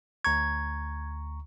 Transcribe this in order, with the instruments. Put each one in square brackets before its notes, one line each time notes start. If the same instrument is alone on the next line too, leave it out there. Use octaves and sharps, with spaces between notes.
[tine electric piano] D2 A#5 C#6 [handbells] G#6